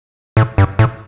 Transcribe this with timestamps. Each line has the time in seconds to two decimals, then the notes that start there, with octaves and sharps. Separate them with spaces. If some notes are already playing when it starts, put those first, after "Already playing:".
0.37 A2
0.58 G2
0.79 A2